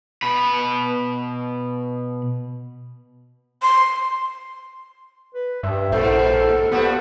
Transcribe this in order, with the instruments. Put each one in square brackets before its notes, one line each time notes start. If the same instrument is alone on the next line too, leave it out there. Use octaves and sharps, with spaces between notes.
[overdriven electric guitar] B2 B5
[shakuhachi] C6
[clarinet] B4
[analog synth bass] G2 [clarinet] E5
[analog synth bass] A#1 [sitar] G#2 B2 [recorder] A4 [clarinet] C5
[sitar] F3 G3 F#4 [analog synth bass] B3 [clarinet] C5